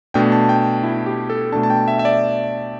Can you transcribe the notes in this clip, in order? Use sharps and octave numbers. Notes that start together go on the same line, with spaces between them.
B2 A3 D4 G5
A5
G5
E4
G4
A4
B2 A3 D4 A5
A5
G5
E5
E5
D5